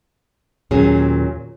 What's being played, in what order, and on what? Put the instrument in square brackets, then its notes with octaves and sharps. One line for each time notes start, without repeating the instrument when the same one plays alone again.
[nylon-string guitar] D#2 A#2 F#3 C#4 G#4